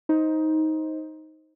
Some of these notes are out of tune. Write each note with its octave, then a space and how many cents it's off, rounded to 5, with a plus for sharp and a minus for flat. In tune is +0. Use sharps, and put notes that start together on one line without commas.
D#4 +15 C5 +10